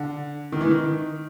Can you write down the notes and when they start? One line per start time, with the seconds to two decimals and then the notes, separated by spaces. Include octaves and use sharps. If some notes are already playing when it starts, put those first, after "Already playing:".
Already playing: D3
0.52 D#3
0.61 E3
0.70 D#3